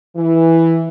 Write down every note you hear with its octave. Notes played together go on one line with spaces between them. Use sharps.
E3